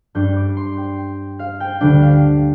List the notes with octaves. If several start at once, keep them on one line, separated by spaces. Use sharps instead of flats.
G2 G3 D4 G6
D6
C6
G5
F5
G5
D2 D3 G3 D4 G5
F5